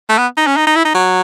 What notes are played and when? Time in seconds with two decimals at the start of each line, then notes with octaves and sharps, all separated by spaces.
0.09 A3
0.18 B3
0.37 D#4
0.47 C#4
0.57 D#4
0.67 D#4
0.76 E4
0.85 D#4
0.95 F#3